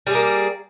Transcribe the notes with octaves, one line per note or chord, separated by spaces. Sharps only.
G3 A#3 G#4